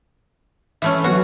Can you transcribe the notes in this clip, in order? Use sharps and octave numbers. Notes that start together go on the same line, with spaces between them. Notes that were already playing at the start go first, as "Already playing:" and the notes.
E3 A3 C#4
F#3 B3 F#4 B4